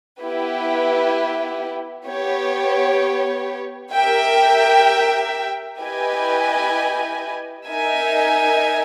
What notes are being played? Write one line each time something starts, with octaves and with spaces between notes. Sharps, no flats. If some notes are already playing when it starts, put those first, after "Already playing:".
B3 E4 G4 B4
B3 G4 C#5
G4 A#4 E5 G5
E4 G4 B4 D#5 G#5
D#4 A#4 E5 G#5